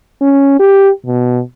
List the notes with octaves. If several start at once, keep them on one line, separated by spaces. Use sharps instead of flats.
C#4
G4
B2